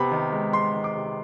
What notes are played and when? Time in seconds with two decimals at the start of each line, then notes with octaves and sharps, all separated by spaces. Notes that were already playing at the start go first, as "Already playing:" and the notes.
Already playing: C3 B3 B5
0.11 D#3
0.32 G#3
0.53 G#3 C6
0.74 D#3
0.84 D6
0.95 C3